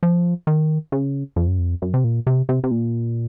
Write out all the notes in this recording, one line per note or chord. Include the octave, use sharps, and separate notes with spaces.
F3
D#3
C#3
F2
F#2
F2
F#2
C3
A#2
C3
C3
C3
A#2